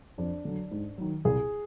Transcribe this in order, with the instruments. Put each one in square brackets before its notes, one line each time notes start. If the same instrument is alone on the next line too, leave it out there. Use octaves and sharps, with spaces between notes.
[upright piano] F2 D4
D3 F#3
G#2
D#3 F#3
C2 G#4